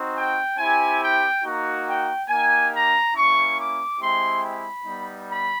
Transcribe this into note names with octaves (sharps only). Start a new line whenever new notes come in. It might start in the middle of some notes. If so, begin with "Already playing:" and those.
Already playing: C4 D#4 F#4
G5
C4 E4 G4 G#5
G5
A#3 D#4 F#4
G5
A#3 D#4 G4 G#5
A#5
A#3 C#4 E4 C#6
D6
G#3 C4 E4 G4 C6
B5
G3 B3 D#4
B5